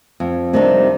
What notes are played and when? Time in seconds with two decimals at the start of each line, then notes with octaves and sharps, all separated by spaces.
0.20 F2
0.53 C3 D#3 G3 D4